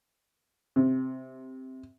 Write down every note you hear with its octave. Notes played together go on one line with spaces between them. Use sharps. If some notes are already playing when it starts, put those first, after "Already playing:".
C3